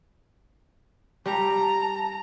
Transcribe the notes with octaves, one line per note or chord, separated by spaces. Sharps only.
G3 A5 A#5